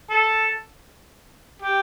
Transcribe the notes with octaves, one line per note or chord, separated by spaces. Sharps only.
A4
G4